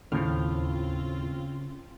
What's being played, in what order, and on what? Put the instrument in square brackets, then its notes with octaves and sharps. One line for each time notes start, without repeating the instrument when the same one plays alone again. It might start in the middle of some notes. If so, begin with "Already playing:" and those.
[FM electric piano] D#2 F6 [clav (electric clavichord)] A2 F3 [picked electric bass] C#3 [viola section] C4 F4